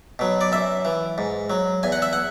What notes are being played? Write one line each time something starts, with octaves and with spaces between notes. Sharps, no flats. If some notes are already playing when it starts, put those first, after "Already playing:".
B2 F#3
D5
F#2 E5
E3
G#2
F#3
E2 G#5
F#5
E5
F#5